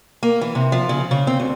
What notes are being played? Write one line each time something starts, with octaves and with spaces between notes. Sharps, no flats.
A#3
E3
C3
F3
C#3
C#3
C4
D2